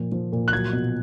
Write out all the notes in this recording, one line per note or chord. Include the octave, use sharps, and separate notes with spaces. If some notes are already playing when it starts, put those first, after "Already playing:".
Already playing: A#2 F3
F3
A#2
F#6
F#3 G#6
B2